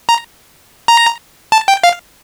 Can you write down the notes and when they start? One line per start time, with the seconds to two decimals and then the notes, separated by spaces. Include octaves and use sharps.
0.09 A#5
0.88 A#5
1.52 A5
1.68 G5
1.84 F5